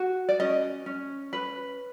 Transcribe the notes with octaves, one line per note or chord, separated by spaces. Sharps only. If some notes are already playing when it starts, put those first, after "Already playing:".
Already playing: F#4
D5
C#4 D#5
C#4
B4